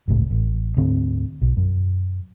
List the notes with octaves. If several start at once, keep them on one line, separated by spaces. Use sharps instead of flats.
G1 C#2 A2
A1
D2 G#2 D3 C4
B1
F#2